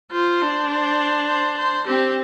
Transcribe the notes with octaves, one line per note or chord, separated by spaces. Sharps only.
F4 C5
D4
C5
C5
C5
C4 G4